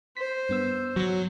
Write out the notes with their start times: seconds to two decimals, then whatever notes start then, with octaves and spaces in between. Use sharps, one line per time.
0.17 C5 B6
0.49 G2 B3 E6
0.96 F#3